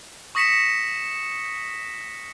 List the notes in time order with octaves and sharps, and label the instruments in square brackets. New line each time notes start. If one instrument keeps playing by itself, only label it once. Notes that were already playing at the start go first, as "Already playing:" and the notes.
[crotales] C#6 D#6 A#6 B6 C#7 E7